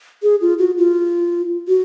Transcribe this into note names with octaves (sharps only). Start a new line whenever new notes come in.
G#4
F4
F#4
F4
F#4